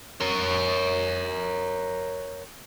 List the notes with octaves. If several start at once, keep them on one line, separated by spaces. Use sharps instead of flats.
A#4 C#5